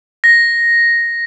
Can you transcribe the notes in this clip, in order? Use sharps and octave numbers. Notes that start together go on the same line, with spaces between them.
A#6